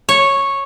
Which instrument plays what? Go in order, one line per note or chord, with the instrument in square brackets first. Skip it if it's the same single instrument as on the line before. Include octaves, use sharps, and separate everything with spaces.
[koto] C#5